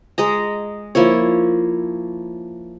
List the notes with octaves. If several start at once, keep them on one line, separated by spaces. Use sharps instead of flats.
G#3 D#5 A#5
F3 A#3 E4 C#5